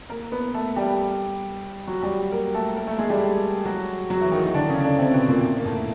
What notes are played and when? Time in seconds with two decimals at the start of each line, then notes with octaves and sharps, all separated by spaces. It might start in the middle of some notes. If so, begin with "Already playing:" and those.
0.10 A#3 A#4
0.32 B3 B4
0.54 A3 A4
0.76 G3 G4
1.87 F#3 F#4
2.02 G3 G4
2.32 A#3 A#4
2.54 A3 A4
2.76 A#3 A#4
2.87 A3 A4
2.98 G#3 G#4
3.10 G3 G4
3.65 F#3 F#4
4.10 F#3 F#4
4.21 E3 E4
4.32 D#3 D#4
4.43 D#3 D#4
4.54 D3 D4
4.69 C#3 C#4
4.84 D3 D4
4.99 C3 C4
5.13 B2 B3
5.28 A#2 A#3
5.57 A#3
5.65 A2 A3